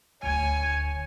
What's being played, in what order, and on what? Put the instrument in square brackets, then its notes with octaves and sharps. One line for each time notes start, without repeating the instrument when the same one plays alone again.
[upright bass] D1 D2 [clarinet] C#5 [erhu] G#5